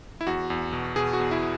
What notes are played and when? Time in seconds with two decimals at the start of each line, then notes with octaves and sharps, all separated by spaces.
0.21 E4
0.27 E2 F#4
0.50 E2
0.73 B2
0.96 B2 G#4
1.13 F#4
1.20 E2
1.31 E4